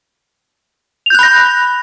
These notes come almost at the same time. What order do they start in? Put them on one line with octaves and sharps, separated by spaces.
F7 G6 F#6 B5 A#6